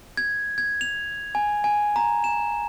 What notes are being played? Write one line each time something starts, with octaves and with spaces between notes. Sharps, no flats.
G#6
G#6
F7
G#5
G#5
A#5
E7